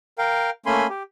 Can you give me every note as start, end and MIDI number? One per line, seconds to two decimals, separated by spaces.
0.18 0.50 70
0.18 0.50 77
0.18 0.50 79
0.66 0.87 57
0.66 0.87 58
0.66 0.87 61
0.66 0.87 80
0.66 0.87 83
0.66 0.87 84
0.90 1.03 67